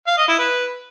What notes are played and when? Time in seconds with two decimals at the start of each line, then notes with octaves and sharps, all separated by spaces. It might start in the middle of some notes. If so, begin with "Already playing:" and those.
0.07 F5
0.17 D#5
0.28 E4
0.38 B4